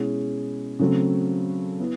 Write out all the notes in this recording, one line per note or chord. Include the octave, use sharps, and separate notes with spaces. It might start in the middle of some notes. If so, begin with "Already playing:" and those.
Already playing: B2 G#3 C#4 E4 G#4
C#3 F#3 A3 C4
B3 E4